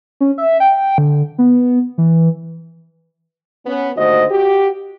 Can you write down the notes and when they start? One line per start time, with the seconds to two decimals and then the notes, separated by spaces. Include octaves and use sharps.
0.21 C#4
0.38 E5
0.60 G5
0.98 D3
1.38 B3
1.98 E3
3.66 B3 C#4
3.97 D#2 D3 A3 F#4 C5 D#5
4.31 F#4 G4